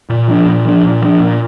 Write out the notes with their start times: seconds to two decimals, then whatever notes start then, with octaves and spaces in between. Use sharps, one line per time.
0.09 A#2
0.28 F3 D4
0.46 A#2
0.65 F3 D4
0.83 A#2
1.02 F3 D4
1.20 A#2